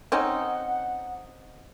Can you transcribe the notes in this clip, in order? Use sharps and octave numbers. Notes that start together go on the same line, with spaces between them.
C4 C#4 D#4 F#5